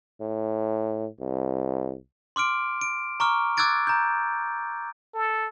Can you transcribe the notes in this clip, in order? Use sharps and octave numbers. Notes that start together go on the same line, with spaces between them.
A2
C2
C6 D6 F6 D7
D7
A#5 C#6 D6 F6
D6 E6 F#6 G#6 A6 D7
A#5 G6
A4